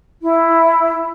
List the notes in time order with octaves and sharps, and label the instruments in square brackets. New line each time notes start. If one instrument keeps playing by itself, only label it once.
[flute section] E4